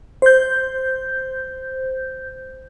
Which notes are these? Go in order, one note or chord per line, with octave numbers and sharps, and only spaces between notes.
C5 G6